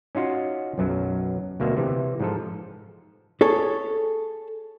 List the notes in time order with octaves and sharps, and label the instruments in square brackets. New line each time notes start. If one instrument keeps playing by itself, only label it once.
[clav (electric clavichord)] C#4 D#4 F4 F#4
B1 F#2 F#3
D2 B2 A#3 E5
C3 E3
G#2 F3 A4
[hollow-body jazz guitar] G#4 A4 C#5